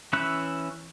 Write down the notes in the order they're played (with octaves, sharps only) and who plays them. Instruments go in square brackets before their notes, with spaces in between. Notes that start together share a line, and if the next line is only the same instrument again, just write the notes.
[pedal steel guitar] E3 C#4 E5 B5 F#6